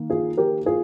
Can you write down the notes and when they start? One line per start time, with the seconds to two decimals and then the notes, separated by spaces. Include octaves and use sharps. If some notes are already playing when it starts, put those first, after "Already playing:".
Already playing: D#3 A#3
0.10 F4 G#4
0.37 G4 A#4
0.66 F4 G#4